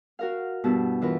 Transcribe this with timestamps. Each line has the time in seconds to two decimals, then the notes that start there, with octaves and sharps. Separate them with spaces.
0.19 F#4 A#4 F5
0.64 G2 B2 B3 E4 A5
1.02 E3 F4 A#4 B4